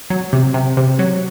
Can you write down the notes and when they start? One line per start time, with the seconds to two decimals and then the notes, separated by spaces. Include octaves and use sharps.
0.10 F#3
0.33 C3
0.54 C3
0.77 C3
0.99 F#3